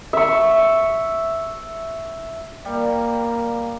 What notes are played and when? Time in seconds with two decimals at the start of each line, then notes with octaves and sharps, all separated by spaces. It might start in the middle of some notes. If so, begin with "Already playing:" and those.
0.13 E5 C#6
2.65 G3 A#3